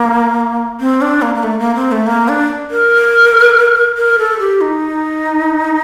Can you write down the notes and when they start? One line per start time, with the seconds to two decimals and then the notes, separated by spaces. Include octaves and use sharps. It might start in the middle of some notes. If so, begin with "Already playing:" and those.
Already playing: A#3
0.80 C4
1.01 D4
1.22 A#3
1.35 A#3
1.43 A3
1.59 A#3
1.75 C4
1.92 A3
2.07 A#3
2.28 D4
2.71 A#4
3.97 A#4
4.19 A4
4.40 G4
4.61 D#4